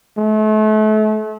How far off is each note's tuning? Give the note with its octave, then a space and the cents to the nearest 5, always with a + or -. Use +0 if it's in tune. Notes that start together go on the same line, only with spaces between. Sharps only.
A3 -35